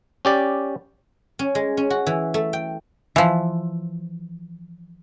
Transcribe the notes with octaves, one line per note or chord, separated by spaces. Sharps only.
C#4 G4 D5
C#4
G#3
C#4
F#4
E3
A3
G5
E3 F3